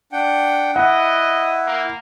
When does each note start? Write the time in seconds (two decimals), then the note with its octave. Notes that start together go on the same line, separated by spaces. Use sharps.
0.12 D4 F#5 G5
0.76 E4 D#5 F#5
1.67 A#3